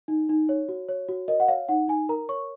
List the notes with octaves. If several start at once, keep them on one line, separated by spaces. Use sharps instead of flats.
D#4
D#4
C#5
F#4
C#5
F#4
A#4 D#5
F#5
C#5 F5
D#4 F#5
D#4 G#5
A#4 A#5
C#5 C#6